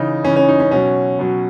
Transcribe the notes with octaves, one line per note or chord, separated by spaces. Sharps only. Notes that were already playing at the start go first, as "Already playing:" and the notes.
Already playing: C#3 E3 D#4
C#3 E3 C#4
C#4
D#4
C#4
B2 F#3 C#4
B2 F#3